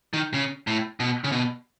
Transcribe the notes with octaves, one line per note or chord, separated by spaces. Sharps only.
D#3
C#3
A2
B2
C#3
B2